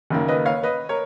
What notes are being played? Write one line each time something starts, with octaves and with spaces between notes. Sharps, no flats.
F#1 F#2 D#3 A#3
B4 D#5
C#5 F5
B4 D#5
A#4 C#5